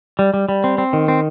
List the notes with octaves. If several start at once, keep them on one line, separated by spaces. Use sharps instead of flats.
G3
G3
G3
C4
C4
D#3
C4